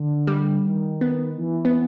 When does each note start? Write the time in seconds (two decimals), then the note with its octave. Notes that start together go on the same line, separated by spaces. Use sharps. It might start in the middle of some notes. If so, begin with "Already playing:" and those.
Already playing: D3
0.27 G3
0.65 D#3
1.01 B3
1.37 E3
1.65 B3